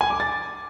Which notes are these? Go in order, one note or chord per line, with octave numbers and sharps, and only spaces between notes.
G#5
D6
A6